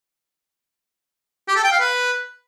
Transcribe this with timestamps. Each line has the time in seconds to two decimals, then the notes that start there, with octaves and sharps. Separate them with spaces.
1.48 G4
1.56 A4
1.64 G5
1.72 F5
1.80 B4